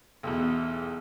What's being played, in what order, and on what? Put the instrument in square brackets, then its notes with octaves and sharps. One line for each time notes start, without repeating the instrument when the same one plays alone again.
[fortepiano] B1 E2